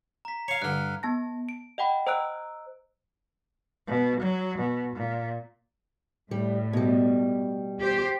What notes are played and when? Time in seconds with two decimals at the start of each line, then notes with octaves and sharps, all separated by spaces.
0.25 A#5 B6
0.48 C#5 F5
0.62 G2 D3 F6 F#6
1.03 B3 A5 A#6
1.49 D7
1.78 D#5 F#5 G5 B5
2.07 C5 D#5 A#5 E6 F#6 D7
3.87 B2
4.20 F#3
4.58 B2
4.95 A#2
6.31 A2 G3
6.73 B2 G3
7.80 G4 C5